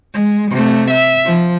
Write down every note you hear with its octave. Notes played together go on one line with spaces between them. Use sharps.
G#3
C3 A3
E5
F3